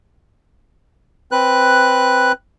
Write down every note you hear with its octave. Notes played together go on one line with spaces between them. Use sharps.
C4 B4 F#6